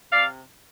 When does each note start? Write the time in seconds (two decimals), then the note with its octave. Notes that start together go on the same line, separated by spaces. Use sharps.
0.12 C3 D5 F5